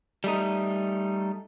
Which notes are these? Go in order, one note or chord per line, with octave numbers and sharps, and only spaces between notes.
G3 A3 D#4